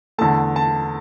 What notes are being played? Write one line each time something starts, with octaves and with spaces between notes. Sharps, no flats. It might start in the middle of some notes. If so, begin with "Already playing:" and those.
E2 D3 A3 A5
A5